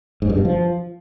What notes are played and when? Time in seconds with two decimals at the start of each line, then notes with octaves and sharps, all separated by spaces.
0.22 G#2
0.30 G2
0.37 B2
0.45 F3